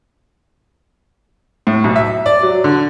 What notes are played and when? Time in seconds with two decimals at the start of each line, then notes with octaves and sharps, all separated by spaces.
1.67 A2
1.84 B1
1.96 E5
2.26 D5
2.43 F#3
2.64 D3